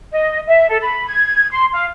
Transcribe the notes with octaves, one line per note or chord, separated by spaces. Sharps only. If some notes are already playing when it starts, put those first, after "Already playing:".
D#5
E5
A4
B5
G#6
C6
F5